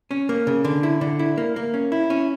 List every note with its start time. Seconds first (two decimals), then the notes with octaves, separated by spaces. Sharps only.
0.11 C#4
0.29 A#3
0.47 C#3
0.65 D3
0.83 E4
1.01 D3
1.19 E4
1.38 A#3
1.56 A#3
1.74 C#4
1.92 E4
2.10 C#4